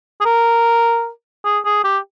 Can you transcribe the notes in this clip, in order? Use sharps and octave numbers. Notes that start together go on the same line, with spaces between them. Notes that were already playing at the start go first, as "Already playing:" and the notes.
G#4
A#4
G#4
G#4
G4